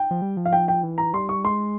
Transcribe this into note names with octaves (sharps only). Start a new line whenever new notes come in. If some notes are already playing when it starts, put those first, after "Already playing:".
Already playing: G5
F3
G3
F3
F5
G5
G5
E3
A#5
G3 C6
C#6
G#3 C6